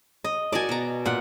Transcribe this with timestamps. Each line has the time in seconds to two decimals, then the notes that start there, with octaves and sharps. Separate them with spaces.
0.24 D#5
0.52 F#4 A#4 D5 G#5 A5
0.69 B2 A#5
1.06 A#2 F#5